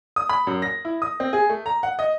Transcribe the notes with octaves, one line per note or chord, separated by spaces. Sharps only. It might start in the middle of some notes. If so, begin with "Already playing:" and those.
D#6
B5
F#2
A#6
E4
D#6
C4
G#4
A3
A#5
F#5
D#5